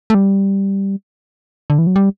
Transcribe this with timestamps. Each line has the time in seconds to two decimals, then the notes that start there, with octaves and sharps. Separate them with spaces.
0.10 A3
0.14 G3
1.70 D3
1.78 E3
1.87 F#3
1.96 G3